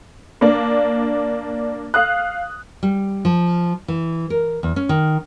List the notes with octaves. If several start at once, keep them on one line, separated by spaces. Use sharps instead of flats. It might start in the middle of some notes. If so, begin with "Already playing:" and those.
A#3 D4
F5 D#6 F#6
G3
F3
E3
A#4
E2
C#4
D#3